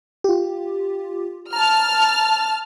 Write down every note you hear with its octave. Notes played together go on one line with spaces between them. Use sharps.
F4 G4
A5 A#5 F6